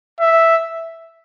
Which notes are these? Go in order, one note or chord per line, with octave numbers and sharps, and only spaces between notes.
E5